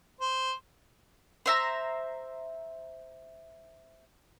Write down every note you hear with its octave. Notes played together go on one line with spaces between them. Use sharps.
C5
C5 E5 A#5